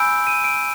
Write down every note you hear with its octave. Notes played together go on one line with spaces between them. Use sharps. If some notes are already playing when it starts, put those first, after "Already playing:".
Already playing: G#5 B5 E6 G6 D7
D#7
D7